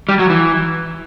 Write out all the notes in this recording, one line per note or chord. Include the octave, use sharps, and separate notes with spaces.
G3
F#3
E3